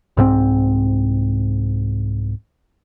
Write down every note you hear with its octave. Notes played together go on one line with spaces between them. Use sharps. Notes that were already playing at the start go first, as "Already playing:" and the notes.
C2 G#2 G#3 C4